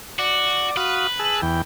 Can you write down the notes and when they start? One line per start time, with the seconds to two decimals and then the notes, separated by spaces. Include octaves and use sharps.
0.19 F#4 D5
0.77 F#4 B4 F5 D#6
1.19 G#4 A5 E6
1.42 E2 G5